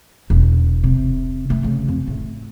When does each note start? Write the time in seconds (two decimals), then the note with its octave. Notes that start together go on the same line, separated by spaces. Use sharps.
0.30 E1
0.84 C3
1.50 A3
1.64 C#3
1.88 F2
2.07 A2